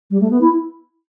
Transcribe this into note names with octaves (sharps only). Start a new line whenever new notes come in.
G3
A3
B3
E4